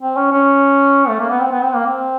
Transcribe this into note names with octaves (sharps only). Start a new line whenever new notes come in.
C4
C#4
C#4
A3
A#3
B3
C4
B3
C4
A#3
C4